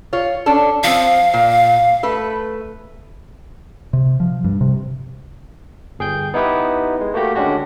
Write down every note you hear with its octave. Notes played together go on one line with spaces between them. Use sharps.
F4 C#5
C#4 D4 A4
F3 C4 F5
A#2
A3 B4
C3
F3
G2
C3
G1 G#4 G5 G6
B3 D#4 E4 G4 B4
G#3
A3 A#3 F#4 G4
D3 G#3 C#4 D4 F#4 G4